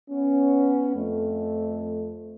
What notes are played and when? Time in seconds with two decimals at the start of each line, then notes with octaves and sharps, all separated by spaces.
0.11 B3 C#4
0.95 F2 A3